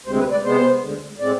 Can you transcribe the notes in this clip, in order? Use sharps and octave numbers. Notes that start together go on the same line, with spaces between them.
D2 C3 G#3 C4 C5
B4
D5
C3 G#3 B3 C5
D2 D3 G#3
A2 G#3 C4 D5